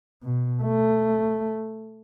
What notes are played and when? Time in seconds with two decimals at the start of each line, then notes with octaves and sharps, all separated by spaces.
0.23 B2
0.63 A3